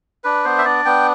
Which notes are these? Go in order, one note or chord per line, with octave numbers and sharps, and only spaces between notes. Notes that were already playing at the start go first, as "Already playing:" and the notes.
D4 B4
B3 C5
E5
D4 D5
B3 G5